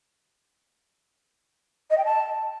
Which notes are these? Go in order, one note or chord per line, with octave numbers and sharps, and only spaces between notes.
D#5
G5
A5